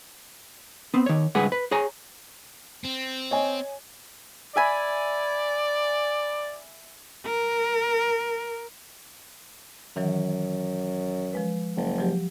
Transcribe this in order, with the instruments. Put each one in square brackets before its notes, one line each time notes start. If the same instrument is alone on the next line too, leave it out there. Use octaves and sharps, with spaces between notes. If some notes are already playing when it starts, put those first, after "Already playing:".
[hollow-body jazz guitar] B3 C4
D#3 C#5
C#2 G2 G#4 B4 F#5
B4
G#4 C#5 G#5 A#5
[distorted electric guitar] C4
[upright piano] C#5 D#5 G#5
[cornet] D5 [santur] E5 G#5 B5
[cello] A#4
[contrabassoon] F#2 [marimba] D#3 E3 F#3
[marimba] F3 G#3 B4
[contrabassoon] F#1
[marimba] F3 F#3 G4